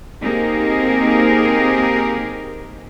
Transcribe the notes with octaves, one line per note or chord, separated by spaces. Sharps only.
A#3 C4 D#4 G4 G#4 A#4